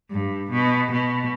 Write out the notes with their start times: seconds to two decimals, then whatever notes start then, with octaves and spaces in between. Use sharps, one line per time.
0.11 G2
0.51 B2
0.91 B2